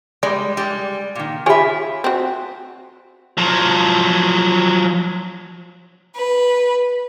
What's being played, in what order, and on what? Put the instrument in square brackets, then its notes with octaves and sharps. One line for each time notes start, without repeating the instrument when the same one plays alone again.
[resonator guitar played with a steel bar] G3 G#3 [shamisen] D5
[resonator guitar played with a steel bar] G3 G#3
A#2 D#3
[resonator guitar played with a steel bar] F4 E5 [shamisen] G4 G#4 C#5 [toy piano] G#5 B5
[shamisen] C4 F#4
[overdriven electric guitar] F3 F#3
[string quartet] B4